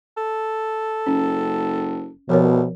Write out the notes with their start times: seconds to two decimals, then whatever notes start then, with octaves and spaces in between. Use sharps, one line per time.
0.17 A4
1.07 F#1 C#4
2.29 C2 B2 F3 A#4 C#5